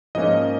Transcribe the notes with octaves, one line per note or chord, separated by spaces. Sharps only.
G#2 F3 A#3 C#4 D#5